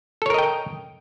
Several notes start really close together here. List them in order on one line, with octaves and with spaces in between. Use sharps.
A4 C#5 A#4 D#5 G5